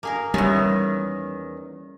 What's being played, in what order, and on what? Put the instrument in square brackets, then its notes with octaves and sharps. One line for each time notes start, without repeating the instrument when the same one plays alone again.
[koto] A#3 G#4 A#4
[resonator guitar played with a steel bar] E2 D#3 [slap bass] G3 [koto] C#4